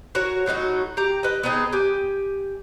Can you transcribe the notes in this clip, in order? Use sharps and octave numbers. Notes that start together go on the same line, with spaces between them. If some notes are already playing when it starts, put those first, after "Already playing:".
F#4 A#4 C#5
A2 F#3 D#4 F#4
G4 A#5
B4 D#5
B3 C4 D#4 G#4
G4 G#5